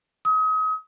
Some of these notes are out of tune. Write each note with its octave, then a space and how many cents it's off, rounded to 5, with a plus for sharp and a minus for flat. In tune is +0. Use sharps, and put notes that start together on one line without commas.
D#6 +35